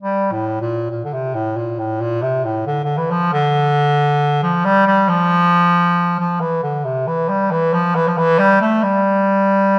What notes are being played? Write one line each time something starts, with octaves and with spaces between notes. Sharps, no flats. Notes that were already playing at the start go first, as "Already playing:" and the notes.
G3
A2
A#2
A#2
D3
C3
A2
A#2
A2
A#2
C3
A2
D3
D3
E3
F3
D3
F3
G3
G3
F3
F3
E3
D3
C3
E3
G3
E3
F3
E3
F3
E3
G3
A3
G3